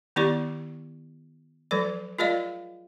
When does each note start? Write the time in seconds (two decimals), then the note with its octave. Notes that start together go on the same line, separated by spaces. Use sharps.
0.16 D#3 B3 E4 G4 D5 C#6
1.71 F3 F#3 A4 D5
2.19 F4 G#4 A#4 D5 D#5 F5